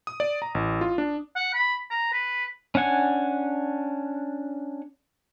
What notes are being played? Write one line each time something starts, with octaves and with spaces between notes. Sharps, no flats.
D#6
D5
A#5
A1
F4
D4
F#5
B5
A#5
B4
C#4 D4 F#5 G#5